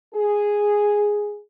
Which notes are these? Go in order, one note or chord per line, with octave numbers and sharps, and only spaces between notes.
G#4